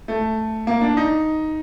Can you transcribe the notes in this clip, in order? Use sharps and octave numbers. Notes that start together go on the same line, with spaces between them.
A3
A#3
D4
D#4